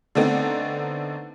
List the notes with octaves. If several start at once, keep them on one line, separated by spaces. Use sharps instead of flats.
D3 A3 B3 C4 D#4